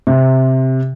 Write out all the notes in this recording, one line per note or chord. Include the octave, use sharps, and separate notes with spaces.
C3